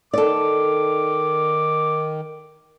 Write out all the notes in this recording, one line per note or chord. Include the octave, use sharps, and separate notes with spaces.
D#3 A4 D5 D6